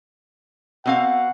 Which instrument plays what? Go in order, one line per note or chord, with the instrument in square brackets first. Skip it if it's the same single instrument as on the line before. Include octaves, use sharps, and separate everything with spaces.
[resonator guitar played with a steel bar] B2 C4 F5 [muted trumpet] F#5